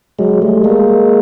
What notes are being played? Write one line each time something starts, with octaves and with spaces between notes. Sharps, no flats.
F#3 G#3
G3 A3
G#3 A#3